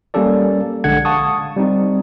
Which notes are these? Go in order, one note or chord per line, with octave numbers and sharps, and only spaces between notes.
G3 A#3 C#4 G4 A4 D5
A#1 D3 G#3 F#5 G#6
F5 F#5 A5 C#6 D#6
G3 C4 D#4